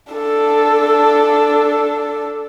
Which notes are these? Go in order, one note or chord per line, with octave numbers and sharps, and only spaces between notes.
D4 A4